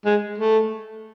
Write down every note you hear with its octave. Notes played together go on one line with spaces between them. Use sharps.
G#3
A3